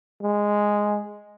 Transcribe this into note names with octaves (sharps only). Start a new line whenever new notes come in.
G#3